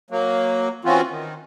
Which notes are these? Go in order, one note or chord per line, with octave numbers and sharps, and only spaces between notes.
F#3 A#3
E3 C4 C#4 F4 F#4
D#3